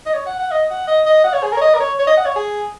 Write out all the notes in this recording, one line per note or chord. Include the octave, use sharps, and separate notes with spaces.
D#5
C#5
F#5
F#5
D#5
F#5
D#5
D#5
F#5
C#5
G#4
A#4
C#5
D#5
A#4
C#5
C#5
D#5
F#5
C#5
G#4